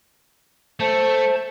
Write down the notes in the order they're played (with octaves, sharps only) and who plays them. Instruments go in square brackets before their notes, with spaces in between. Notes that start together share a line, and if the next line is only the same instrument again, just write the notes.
[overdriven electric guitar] A3 [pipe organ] C5 A5